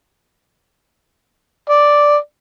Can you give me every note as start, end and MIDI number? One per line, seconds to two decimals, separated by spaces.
1.69 2.16 74